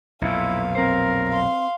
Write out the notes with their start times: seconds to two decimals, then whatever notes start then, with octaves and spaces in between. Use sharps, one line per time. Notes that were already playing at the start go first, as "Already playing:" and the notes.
0.22 B1 F2 A#2 E4 F5
0.75 C4 A#4 C5
1.29 F5 C6